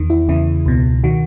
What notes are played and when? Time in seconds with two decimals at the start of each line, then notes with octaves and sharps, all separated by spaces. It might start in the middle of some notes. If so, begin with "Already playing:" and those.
Already playing: E2 D#3
0.10 E4
0.28 E2 C#3 E3 E4
0.66 C#2 B2
1.04 D#3 F#4